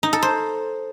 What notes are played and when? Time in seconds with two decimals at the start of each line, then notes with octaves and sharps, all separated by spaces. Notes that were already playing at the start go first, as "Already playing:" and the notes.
0.03 D#4
0.13 A4
0.22 C5